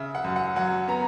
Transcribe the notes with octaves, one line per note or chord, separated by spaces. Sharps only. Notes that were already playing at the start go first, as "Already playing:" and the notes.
Already playing: C#3 E5
F#5
F#2
F#5
F#3 F#5
B3 A#5